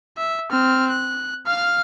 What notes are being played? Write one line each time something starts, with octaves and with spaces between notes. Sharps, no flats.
E5
C4 F6
F#6
F5 F6